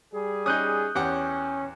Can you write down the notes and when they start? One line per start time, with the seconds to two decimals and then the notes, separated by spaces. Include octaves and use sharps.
0.13 G3 G#4
0.46 C#4 D#4 D#6 F#6 G6
0.95 E2 C#4 G4 F#5